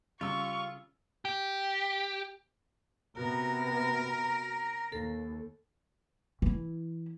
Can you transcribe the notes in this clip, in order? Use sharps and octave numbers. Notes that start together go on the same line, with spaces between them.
C#3 G3 F4 C#6 E6
G4
C3 B3 F#4 A#4 A#5
D#2 A4
E3 E4